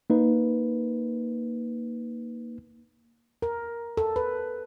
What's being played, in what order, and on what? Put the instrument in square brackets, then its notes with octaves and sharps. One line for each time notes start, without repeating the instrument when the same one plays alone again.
[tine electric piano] A#3 D#4 B4
[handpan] A#4
A4
B4